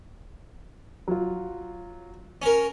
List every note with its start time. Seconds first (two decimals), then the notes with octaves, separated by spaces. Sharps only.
1.08 F#3 F4
2.42 C#4 A#4